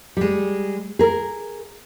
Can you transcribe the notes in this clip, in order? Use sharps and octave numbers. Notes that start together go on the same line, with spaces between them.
G3 G#3
G#4 A#4